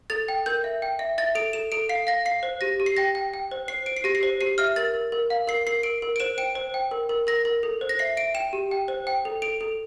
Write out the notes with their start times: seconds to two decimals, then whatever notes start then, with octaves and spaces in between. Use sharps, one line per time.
0.10 A4 A6
0.28 G5
0.46 A#4 G6
0.64 E5
0.82 G5
0.99 E5
1.18 E5 A6
1.35 A4 D7
1.53 A4 E7
1.72 A4 D7
1.89 F5 C7
2.07 F5 A#6
2.25 F5 C7
2.43 C5
2.61 G4 A#6
2.80 G4
2.86 C7
2.97 G5 A#6
3.15 G5
3.34 G5
3.51 C5
3.68 C5 C7
3.86 C5 D7
3.97 C7
4.04 G4 A#6
4.15 C7
4.23 C5
4.41 G4 C7
4.58 E5 F6
4.76 A#4 A6
4.94 A#4
5.12 A#4
5.30 F5
5.48 A#4 C7
5.67 A#4 C7
5.83 A#4 D7
6.02 A#4
6.16 D7
6.20 C5 E7
6.38 G5 D7
6.55 C5
6.74 G5
6.91 A#4
7.09 A#4
7.27 A#4 A#6
7.45 A#4
7.63 A4
7.81 C5
7.89 A#6
7.99 E5 C7
8.17 E5 D7
8.34 G5 E7
8.53 G4
8.71 G5
8.88 C5
9.07 G5
9.25 A4
9.42 A4 D7
9.61 A4